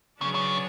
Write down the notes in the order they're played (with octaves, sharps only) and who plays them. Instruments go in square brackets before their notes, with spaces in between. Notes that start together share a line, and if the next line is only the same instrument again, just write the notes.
[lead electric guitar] C#3 [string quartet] F#3 B3 D4 G#4 C#5
[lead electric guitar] C#3